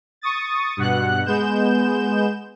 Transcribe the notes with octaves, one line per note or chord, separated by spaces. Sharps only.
C#6 D#6 A6
G2 B2 F#5 F#6
G#3 B3 G6 E7